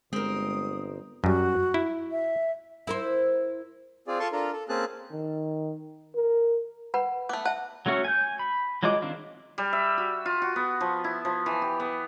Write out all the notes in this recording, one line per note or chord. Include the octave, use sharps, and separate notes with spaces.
G1 G#3 C4 A#4 D#6
F#2 G3 F#4
E4
E5
E4 A#4 C5
C4 F4 G#4 D5
F4 A4 A5 C6 C#6
D4 F4 A4 A#4
A4
A#3 C4 C#4 G#4 A5 F#6
D#3
A#4
B4 F#5 B5
A3 B3 D6
E5 F#5 A5
F#3 A3 C#4 F#4
G#5 G6
B5
F#3 G#3 F4 D#5 D6
D#3 C4 D4 F4
G3
E5
F#4
F4
F#4
B3
F3
E4
F3
E3
G4
B3